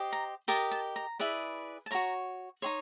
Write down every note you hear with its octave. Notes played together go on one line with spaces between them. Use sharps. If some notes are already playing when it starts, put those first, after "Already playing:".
Already playing: G4 C5 D#5
A#5
G4 A#4 D#5 A5
A5
A#5
E4 G#4 B4 D5
A5
F#4 A#4 C#5 A#5
D#4 G#4 C#5 C6